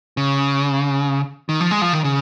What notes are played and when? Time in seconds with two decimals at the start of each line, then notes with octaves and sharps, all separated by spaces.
0.17 C#3
1.49 D#3
1.61 F3
1.71 G#3
1.82 F3
1.93 D#3
2.04 C#3